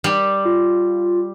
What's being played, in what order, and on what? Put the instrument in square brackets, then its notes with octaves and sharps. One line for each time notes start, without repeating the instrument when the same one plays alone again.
[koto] G3
[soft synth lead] F4